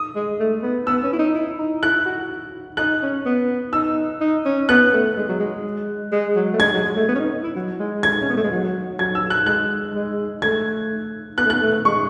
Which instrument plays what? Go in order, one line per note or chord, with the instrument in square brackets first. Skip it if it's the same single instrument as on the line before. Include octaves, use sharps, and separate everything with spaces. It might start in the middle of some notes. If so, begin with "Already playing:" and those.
Already playing: [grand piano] D#6
[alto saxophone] G#3
A3
B3
[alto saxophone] B3 [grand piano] E6
[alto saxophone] C#4
E4
D#4
E4
D#4
[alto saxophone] E4 [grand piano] F#6
[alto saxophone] E4
F#4
[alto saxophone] D#4 [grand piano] F#6
[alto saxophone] C#4
B3
[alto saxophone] D#4 [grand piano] E6
[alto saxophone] D#4
C#4
[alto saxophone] B3 [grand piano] F#6
[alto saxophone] A3
G#3
F#3
G#3
G#3
F#3
A3
[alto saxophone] G#3 [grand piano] G#6
[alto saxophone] F#3
G#3
A3
B3
C#4
D#4
E4
F#3
G#3
[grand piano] G#6
[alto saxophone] C#4
B3
A3
G#3
F#3
[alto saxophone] F#3 [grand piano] G#6
[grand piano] E6
F#6
[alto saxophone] G#3 [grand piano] F#6
[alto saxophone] G#3
[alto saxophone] A3 [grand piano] G#6
[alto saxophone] B3 [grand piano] F#6
[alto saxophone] A3
[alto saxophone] B3 [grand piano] F#6
[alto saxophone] A3
[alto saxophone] G#3 [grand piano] C#6